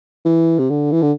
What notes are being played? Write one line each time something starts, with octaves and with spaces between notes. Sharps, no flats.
E3
C3
D3
E3
D3